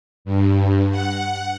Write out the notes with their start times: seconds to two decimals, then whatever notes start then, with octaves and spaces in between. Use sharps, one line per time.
0.25 G2
0.91 F#5